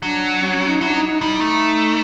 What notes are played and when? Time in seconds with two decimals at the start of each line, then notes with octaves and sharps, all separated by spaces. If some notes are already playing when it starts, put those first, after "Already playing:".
0.02 F#3 D4
0.42 C#4
0.55 C#4
0.68 D#4
0.81 F#3 E4
0.89 D4
0.95 D#4
1.07 D#4
1.20 G3 D#4
1.41 A3